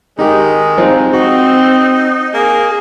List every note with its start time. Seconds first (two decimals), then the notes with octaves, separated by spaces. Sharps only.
0.19 D#3 G#3 D#4 G4
0.78 F3 C4 D#4
1.13 C4 D#4 F#4
2.34 A#3 G#4